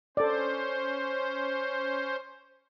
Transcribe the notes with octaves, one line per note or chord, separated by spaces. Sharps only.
C#4 A4 C5 D5